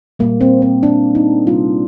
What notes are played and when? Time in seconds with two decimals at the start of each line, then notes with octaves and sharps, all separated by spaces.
0.19 A#2 G3 A#3
0.41 C4
0.62 C4
0.83 D4
1.15 D#4
1.47 C3 G3 A#3 F4